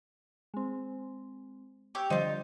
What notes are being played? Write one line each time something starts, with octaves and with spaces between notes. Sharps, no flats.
G#3 C4
G4 C#5 D6 E6 G6
D3 F3 G3 D#4 F4 C5 G6